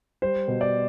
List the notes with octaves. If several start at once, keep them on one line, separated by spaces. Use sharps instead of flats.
G3 C5
B2
D5